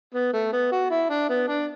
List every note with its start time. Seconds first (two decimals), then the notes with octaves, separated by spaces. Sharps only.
0.14 B3
0.33 A3
0.53 B3
0.72 F#4
0.91 E4
1.10 D4
1.29 B3
1.48 D4